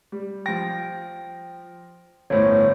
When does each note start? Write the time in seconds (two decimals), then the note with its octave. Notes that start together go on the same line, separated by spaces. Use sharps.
0.12 G3
0.46 F3 G5 A#6
2.30 G1 A2 C5 C#5